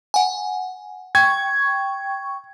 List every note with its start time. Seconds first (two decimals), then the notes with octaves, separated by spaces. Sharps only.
0.14 F#5 G#5
1.15 G5 C#6 G#6